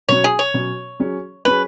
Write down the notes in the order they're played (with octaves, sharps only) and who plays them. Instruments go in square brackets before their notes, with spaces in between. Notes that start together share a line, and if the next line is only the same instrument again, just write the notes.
[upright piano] B2 F#3 C#4 [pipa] C#5
[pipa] G#4
C#5
[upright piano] B2 F#3 C#4
F#3 C#4 G#4
[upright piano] F#3 C#4 G#4 [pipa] B4